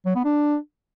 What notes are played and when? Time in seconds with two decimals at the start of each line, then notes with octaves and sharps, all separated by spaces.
0.06 F#3
0.15 B3
0.25 D4